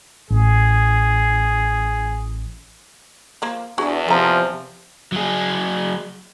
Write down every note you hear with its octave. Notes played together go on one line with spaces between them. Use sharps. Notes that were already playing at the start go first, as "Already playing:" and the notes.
A1 G#4
F3 A#3
E2 D4 F#4 G#4
C3 F3 A4 A#5
F#3 G#4